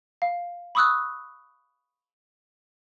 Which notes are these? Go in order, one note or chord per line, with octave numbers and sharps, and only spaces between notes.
F5
B5 C#6 D#6 E6 F#6